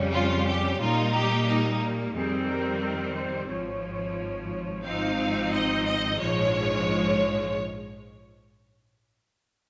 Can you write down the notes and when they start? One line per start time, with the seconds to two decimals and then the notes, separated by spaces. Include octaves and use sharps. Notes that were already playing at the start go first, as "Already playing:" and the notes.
Already playing: F2 C#3 G3 C#4
0.11 F4
0.45 G4
0.79 A#2 G3 A#3 D#4 F4
1.12 G4
1.46 D#4
2.13 F2 D#3 G3 C4 G#4
2.48 A#4
2.82 A#4
3.15 C5
3.48 G#1 G#2 F3 C#5
4.84 G#1 G#2 F3 C4 D#4 F5
5.51 D#5
5.85 D#5
6.19 A#1 G#2 F3 G#3 C#5